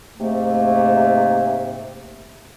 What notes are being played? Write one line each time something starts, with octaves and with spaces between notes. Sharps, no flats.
G#2 C3 A3 A#3